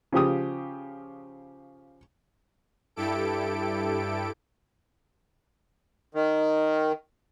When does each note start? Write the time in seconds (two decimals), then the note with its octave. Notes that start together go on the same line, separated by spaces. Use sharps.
0.12 C#3 F3 G4 D#6
2.96 G2 E4 G4 A4 D7
6.14 D#3